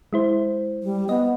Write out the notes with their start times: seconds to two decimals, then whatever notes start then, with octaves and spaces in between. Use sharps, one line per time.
0.13 G#3 E4 C5
0.83 G3
1.09 B3 D#5